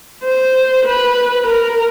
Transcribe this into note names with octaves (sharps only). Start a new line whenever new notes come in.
C5
B4
A#4